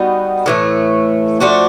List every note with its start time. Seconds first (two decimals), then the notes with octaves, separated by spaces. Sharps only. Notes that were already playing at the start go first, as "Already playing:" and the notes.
Already playing: G3 B3 D#4 F#4
0.46 A2 E3 A3
1.40 F3 A3 D4 F#4